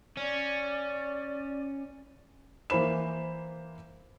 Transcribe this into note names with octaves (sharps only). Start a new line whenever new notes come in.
C#4 D5
E3 A#3 C5 B5 E7